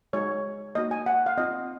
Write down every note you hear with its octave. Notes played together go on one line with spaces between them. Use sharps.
G#3 D#4 F#4 C#5
A#3 D#4 F#4 D#5
G#5
F#5
F5
C4 F4 D#5